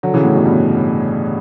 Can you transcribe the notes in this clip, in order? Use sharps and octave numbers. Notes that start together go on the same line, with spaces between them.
D3 F#3
C#3 E3
A2
G2 B2
G2 B2